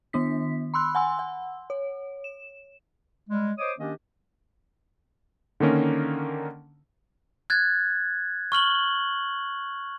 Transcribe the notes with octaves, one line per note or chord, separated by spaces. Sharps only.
D#3 B3 D4 B6
B5 C6 E6 F#6
F#5 G#5 C6 E6
F#5
C#5
E7
G3 G#3
C5 C#5 D#5 D6 D#6
D#3 A#3 C#4 D4 G4 D#5
D3 D#3 A#3 C#4 A#4
F#6 G#6 A6
C#6 F6 F#7 G7